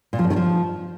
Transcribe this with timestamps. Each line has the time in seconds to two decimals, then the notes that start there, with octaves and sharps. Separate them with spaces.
0.13 A#2
0.19 F3
0.25 F#2
0.30 D#3
0.36 F3